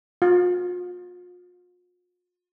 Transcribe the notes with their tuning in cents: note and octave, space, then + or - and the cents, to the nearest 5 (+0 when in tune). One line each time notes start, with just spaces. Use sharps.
F4 +40